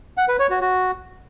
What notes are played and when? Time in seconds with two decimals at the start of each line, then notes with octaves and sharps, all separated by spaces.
0.17 F#5
0.28 B4
0.39 C#5
0.50 F#4
0.61 F#4